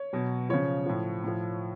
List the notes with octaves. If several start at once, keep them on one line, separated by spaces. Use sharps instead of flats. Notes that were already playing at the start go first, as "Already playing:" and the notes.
Already playing: C#5
B2 F#3
C#3 F3 C#5
A2 F3
A2 F3